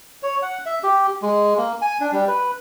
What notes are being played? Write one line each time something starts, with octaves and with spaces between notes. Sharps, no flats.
C#5
F#5
E5
G4
G#3
A#3
G#5
D4
G3
B4